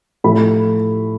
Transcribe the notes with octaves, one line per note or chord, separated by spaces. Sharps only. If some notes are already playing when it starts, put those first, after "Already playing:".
A2 F3 A3 B5